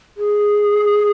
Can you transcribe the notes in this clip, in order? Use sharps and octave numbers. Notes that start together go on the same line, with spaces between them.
G#4